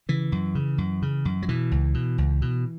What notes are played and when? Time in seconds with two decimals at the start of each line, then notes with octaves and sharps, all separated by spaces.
0.09 C#3 E3
0.32 F#2
0.55 C#3
0.78 F#2
1.02 C#3
1.25 F#2
1.42 F#3
1.48 B2 E3
1.72 C#2
1.94 B2
2.18 C#2
2.42 B2